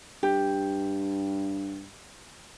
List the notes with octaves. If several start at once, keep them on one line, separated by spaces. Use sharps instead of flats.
G2 G4